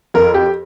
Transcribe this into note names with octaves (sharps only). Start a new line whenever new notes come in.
F2 A#4
G4